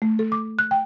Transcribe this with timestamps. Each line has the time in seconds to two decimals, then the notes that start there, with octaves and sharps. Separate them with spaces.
0.02 A3
0.19 A4
0.32 D6
0.59 F#6
0.71 G5